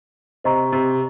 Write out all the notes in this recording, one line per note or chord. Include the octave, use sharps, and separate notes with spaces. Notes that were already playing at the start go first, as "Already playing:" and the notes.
C3 C5 D#5 A#5 C#6
C3